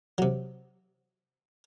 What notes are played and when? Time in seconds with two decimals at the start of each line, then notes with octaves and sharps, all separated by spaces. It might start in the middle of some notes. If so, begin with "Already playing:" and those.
0.18 C3 F#3